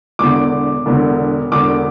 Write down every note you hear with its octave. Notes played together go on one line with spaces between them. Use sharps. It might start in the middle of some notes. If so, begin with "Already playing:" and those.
E1 E2 D3 D6
E1 E2 D3
E1 E2 D3 D6